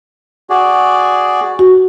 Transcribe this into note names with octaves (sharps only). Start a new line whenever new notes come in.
F#4 G#4 D5
F#4